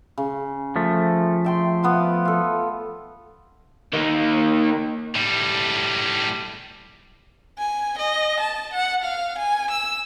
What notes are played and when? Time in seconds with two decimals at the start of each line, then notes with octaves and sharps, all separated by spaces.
0.18 C#3
0.76 F3 A3
1.44 E5 G5 C6
1.83 B3 F4 E5
2.25 F4 A4
3.93 D#3 A#3
5.15 A2 G3
7.59 G#5
7.98 D#5
8.40 A5
8.74 F#5
9.03 F5
9.38 G#5
9.71 E6